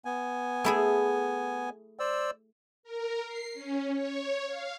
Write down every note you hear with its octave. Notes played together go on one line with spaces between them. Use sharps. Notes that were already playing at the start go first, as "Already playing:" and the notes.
B3 G#5
A3 E4 G#4
C5 D5 E6
A#4
C7
C#4
C#5
F5